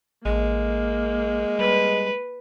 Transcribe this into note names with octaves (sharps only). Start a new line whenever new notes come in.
A1 G#3 A#3
G3 B4